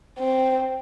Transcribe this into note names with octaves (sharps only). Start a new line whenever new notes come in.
C4